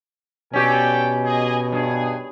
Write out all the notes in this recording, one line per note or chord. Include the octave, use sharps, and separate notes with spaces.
B2 C#4 G4 A4 D5 G5
G#4 D#5
G2 G#4